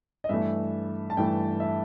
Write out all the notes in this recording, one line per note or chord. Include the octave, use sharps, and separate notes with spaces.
D#5
G2 E3 A3 E5
A5
G2 E3 A3 G5
E5